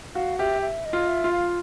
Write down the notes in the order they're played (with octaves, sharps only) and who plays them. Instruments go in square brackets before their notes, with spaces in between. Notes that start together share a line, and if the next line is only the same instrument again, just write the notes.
[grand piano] F#4 [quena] F5
[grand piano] G4 [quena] E5
[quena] E5
D#5
[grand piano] F4
[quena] E5
[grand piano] F4
[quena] F5